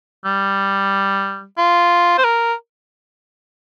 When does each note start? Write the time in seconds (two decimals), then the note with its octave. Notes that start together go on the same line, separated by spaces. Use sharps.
0.25 G3
1.58 F4
2.18 C5
2.24 A#4